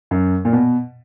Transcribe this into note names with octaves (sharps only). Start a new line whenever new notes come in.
F#2
A#2
B2